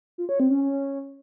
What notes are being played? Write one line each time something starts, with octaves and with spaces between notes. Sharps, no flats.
F4
C#5
C4
C#4
C#4